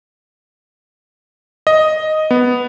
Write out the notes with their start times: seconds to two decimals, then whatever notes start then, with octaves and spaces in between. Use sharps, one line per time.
1.67 D#5
2.31 B3